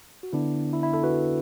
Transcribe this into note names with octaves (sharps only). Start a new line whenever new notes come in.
F#4
D3 B3 D4 E4
E4
E4
E4 A4
F#4 B4